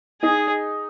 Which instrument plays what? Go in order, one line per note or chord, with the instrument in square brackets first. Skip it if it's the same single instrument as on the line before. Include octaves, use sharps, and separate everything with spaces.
[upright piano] D#4 [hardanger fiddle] G#4